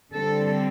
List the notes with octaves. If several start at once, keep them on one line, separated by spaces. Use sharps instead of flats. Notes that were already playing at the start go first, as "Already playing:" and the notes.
D3 G3 C4 A4